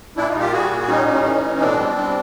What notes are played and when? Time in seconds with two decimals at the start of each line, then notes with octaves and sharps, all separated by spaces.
0.17 A#2 D4 E4
0.29 D#4 F4
0.35 G3
0.40 F4 G4
0.52 G3 F#4 G#4
0.71 A#2
0.88 G3 C#4 D#4
1.07 A2
1.24 E3
1.43 A2
1.61 B2 C4 D4
1.79 G3
1.97 G3